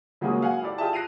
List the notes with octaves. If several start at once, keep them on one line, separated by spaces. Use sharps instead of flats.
C#3 F#3 G#3 A#3 C#4 G#4
F#4 F5 F#5 G#5
E4 G4 A4 D5
F4 G#4 A4 E5 G5 A5
F#6 A#6 C7 D7 D#7 F7